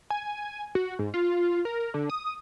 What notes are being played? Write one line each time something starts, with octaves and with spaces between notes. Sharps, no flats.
G#5
F#4
G#2
F4
A#4
D3
D#6